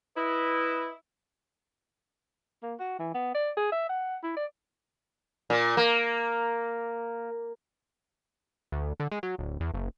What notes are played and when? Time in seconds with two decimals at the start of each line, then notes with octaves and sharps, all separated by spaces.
0.17 E4 B4 D#5
2.62 A#3
2.79 F#4
2.99 E3
3.14 B3
3.34 D5
3.57 G#4
3.72 E5
3.89 F#5
4.23 E4
4.36 D5
5.50 A#2
5.77 A#3
8.72 D2
9.00 D3
9.12 G#3
9.23 F#3
9.38 D1
9.60 E2
9.74 F#1